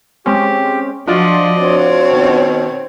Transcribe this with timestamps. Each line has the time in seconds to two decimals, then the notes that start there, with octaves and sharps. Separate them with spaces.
0.26 G#3 C4 C#4 G4
1.07 F3 D4 F4 F#4 D5 D#5
1.58 C4 C#5
2.11 B2 D#3